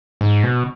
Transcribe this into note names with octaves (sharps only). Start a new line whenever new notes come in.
G#2
B2